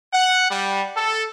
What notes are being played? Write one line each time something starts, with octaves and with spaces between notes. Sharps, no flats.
F#5
G3
A4